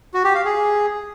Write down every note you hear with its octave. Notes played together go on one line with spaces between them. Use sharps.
F#4
G4
F5
G#4